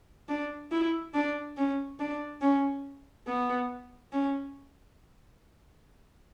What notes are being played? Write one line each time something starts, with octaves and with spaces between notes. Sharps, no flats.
D4
E4
D4
C#4
D4
C#4
B3
C#4